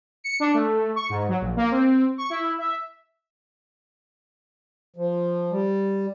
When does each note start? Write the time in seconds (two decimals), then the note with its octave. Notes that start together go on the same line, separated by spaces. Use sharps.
0.24 C#7
0.40 D4
0.54 A3
0.96 C#6
1.10 G#2
1.29 F#3
1.41 A#1
1.57 A#3
1.71 C4
2.18 C#6
2.30 E4
2.58 E5
4.96 F3
5.51 G3